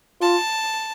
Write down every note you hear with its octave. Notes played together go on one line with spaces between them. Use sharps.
F4 A5